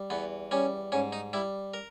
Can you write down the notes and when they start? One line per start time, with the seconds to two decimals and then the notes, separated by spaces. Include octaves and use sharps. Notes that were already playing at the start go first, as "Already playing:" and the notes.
Already playing: G3
0.10 E2 B3
0.51 G3 C#4
0.92 G#2 C#4
1.13 D#4
1.33 G3 E4
1.74 A#4